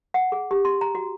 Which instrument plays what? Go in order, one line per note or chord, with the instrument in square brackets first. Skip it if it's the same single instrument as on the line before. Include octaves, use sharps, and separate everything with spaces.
[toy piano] F#5
G#4
G4
C6
A#5
F#4